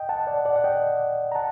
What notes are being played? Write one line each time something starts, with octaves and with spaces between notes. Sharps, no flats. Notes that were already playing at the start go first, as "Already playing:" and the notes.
Already playing: D#5 G5
F#5 A5
D5 F#5
D5 F#5
F#5
D#5 G5
A#5
F#5 A5